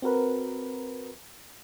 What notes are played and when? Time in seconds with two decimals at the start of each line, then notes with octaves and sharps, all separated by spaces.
0.02 C4 F#4 A#4 B4